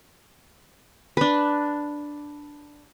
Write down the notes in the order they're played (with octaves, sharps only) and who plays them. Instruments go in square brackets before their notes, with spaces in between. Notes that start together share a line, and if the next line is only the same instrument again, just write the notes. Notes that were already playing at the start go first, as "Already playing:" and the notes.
[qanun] D4 B4